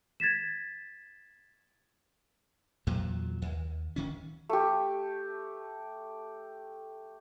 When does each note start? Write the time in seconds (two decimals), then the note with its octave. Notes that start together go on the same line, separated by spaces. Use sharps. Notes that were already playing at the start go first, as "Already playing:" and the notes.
0.20 G#6 A6 B6 E7
2.87 E2 A#2 F#3
3.42 D#2
3.96 D1 D#3 C#4
4.49 A3 G4